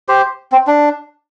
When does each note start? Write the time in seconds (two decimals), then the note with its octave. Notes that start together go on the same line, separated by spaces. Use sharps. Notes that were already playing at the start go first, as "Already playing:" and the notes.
0.08 G4 C5
0.52 C4
0.67 D4